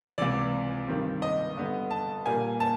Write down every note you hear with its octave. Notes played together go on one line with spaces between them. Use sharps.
C#2 C3 E3 D5
G2 D#3 G3 C4
D#5
G2 D3 G3 B3
A5
A#2 G3 A#3 G#5
A5